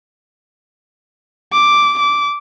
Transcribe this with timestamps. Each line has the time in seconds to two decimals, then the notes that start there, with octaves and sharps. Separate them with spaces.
1.53 D6
1.99 D6